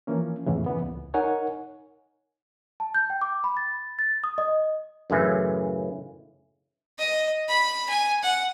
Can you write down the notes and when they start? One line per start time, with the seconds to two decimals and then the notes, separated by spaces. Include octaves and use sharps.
0.07 E3 F3 A#3 C#4
0.47 F2 A2 C#3 E3
0.66 E3 B3
0.82 C#2
1.14 D#4 A#4 C#5 F#5 G#5
2.80 A5
2.94 G6
3.10 G5
3.21 D6
3.44 B5
3.57 A6
3.99 A6
4.24 D#6
4.38 D#5
5.10 F#2 A2 C#3 E3
6.98 D#5
7.48 B5
7.89 G#5
8.23 F#5